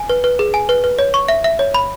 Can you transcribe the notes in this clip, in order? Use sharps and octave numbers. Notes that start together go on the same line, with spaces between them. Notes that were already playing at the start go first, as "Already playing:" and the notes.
Already playing: G#5
B4
B4
G#4
G#5
B4
B4
C#5
C#6
E5
E5
C#5
B5